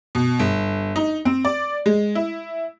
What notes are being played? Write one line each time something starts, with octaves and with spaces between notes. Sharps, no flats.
B2
G1
D#4
C4
D5
G#3
E4